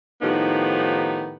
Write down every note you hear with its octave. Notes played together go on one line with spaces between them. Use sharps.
A2 D#3 F3 B3 D#4 G4